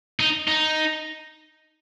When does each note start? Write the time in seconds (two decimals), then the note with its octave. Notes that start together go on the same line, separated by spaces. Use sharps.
0.20 D#4
0.48 D#4